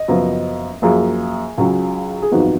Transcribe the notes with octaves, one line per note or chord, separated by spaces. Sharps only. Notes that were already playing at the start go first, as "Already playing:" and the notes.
Already playing: D#5
F#1 F#2 F3 B3
F#2 F3 A#3 G#4
C#2 C#3 F#3 C#4
G#4
G#1 F#2 F3 B3 D#4 F#4